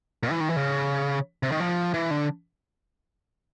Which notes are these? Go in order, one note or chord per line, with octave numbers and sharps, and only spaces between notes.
A#2
E3
D#3
E3
C#3
C3
D#3
F3
E3
D3